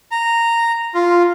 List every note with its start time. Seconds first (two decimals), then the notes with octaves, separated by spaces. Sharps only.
0.11 A#5
0.95 F4